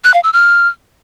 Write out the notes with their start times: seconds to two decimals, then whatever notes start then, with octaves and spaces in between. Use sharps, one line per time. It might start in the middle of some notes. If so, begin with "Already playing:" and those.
0.04 F#6
0.14 F5
0.24 E6
0.33 F6